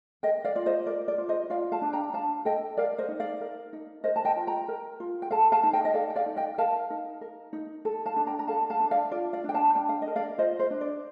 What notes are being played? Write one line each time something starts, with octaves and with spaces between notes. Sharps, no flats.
A#4 D#5 G5
D5 F5
F4 D5
C5 D#5
A#4 D5
D5
F4
C5 D#5
F4 D5 F5
F5 A5
D4
G5 A#5
D4 F5 A5
A4 D#5 G5
A#4 D5 F5
C5 D#5
D#4
D5 F5
A#4
D#4
A#4 C5 D#5
A5
D#5 G5
F4
G5 A#5
A#4
F4
G5
A4 F5 A5
F5 A5
D#4
D#5 G5
D#5
A4 D5 F5
G5
D5 F5
D#4
D#5 G5
A#4 F5 A5
D#4
A#4
D#4
A4
F5 A5
D4
G5 A#5
A#5
A4 F5 A5
F5 A5
D4
D5 F5
F4 D5
D5 F5
D4 G5
F5 A5
D4 G5
F5
D#5
A#4
D5 F5
F4 C5 D#5
C5
D4
D5